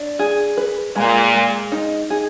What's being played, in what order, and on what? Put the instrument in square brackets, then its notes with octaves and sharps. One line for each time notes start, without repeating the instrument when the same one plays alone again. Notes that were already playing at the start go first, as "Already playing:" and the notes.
Already playing: [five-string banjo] D4
G#4
B4
[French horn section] A#2 [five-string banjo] G#3
[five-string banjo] G#3
D#4
G#4